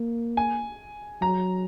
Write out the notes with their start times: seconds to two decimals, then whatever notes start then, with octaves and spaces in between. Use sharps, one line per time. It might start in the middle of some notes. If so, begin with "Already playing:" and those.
Already playing: A#3
0.37 G#5
1.21 F#3 A#5